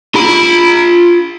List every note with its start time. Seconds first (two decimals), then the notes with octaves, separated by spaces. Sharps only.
0.15 F4 B5